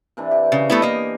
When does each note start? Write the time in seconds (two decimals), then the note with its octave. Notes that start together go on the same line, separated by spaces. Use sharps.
0.17 C3 E3 D4
0.31 G4
0.52 C#3
0.70 A3 B3 E4
0.82 A#3 D#5